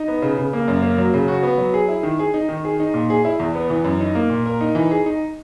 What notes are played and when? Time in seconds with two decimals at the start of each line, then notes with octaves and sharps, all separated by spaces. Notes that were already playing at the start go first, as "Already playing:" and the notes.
Already playing: D#4
0.08 B3
0.22 C#3
0.38 C#3
0.53 A#3
0.68 F#2
0.82 A#3
0.98 F#3
1.14 C#3
1.28 F#4
1.43 B3
1.58 F#3
1.74 G#4
1.88 E4
2.03 D#3
2.19 G#4
2.34 D#4
2.49 D#3
2.65 G#4
2.80 D#4
2.94 A#2
3.10 G#4
3.25 E4
3.40 E2
3.55 B3
3.70 E3
3.84 F#2
4.01 D#4
4.15 A#3
4.30 A#2
4.46 A#4
4.61 D#4
4.75 E3
4.91 G#4
5.06 D#4